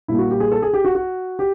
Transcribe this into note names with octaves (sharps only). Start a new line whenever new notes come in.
A#2 G3 A#3 E4
F#4
G4
G#4
A4
G#4
G4
F#4
F#4
G4